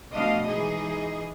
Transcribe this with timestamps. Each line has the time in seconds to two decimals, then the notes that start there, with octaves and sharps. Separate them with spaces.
0.13 B2 F3 A3 D4 D#5 F5
0.46 E3 G#3 D#4 G#4 D#5